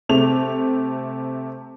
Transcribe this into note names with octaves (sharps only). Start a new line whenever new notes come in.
C3 A3 F7